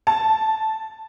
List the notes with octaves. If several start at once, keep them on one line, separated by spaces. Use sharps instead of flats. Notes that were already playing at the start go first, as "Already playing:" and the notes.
A5